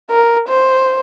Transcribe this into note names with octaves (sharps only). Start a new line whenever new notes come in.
A#4
C5